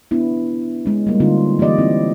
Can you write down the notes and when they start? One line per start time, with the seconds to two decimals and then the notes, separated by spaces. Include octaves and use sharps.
0.11 B3 C#4 D4 E4
0.86 G#3 C#4
1.07 G3 A#3
1.20 D3 C4 D#4 F4
1.59 E3 A#3 G4 D5 D#5
1.78 C4 E4